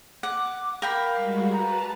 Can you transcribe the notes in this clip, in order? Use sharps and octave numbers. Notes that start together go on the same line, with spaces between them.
F#5 D6
A#4 F5 G5 B5
G3 G#3 F#4
B4 A5 A#5